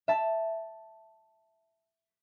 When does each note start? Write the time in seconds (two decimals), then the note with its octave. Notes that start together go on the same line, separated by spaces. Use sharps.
0.08 E5 A5